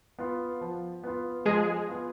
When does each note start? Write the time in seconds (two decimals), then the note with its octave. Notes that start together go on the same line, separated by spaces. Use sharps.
0.19 B3 F4
0.61 F3
1.04 B3 F4
1.46 F3 G#3 G#4
1.89 B3 F4